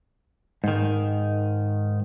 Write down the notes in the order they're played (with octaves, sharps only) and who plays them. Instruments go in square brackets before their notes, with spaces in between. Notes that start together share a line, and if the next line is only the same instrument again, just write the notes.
[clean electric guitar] G#2 D#3